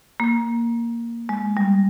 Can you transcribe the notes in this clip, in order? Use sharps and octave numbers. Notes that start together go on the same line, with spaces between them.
A#3
G#3
G3